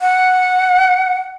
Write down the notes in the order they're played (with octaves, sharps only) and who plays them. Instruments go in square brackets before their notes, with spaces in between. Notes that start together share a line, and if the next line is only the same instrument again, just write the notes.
[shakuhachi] F#5